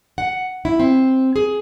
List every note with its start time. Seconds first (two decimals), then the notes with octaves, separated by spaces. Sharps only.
0.18 F#5
0.65 E4
0.80 C4
1.36 G#4